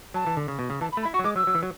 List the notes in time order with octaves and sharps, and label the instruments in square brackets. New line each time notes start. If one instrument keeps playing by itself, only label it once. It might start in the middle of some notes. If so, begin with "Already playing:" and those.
[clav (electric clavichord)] F#3 [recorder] A5
[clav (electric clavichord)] E3
D3
C#3
B2
C#3
[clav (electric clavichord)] E3 [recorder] A5
[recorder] B5
[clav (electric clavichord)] A3
[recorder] B5
[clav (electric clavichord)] E4
[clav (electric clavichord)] F#4 [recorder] C#6
[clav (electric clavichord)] F#3
[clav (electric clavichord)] G#3 [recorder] D6
[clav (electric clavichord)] F#3 [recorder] E6
[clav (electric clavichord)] F#3
E3
F#3